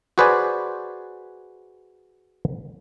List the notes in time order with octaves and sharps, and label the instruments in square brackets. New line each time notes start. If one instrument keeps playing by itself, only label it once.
[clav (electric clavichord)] F#4 G#4 B4 C5 D5 G#5